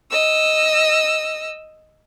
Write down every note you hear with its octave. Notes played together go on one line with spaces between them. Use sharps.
D#5 E6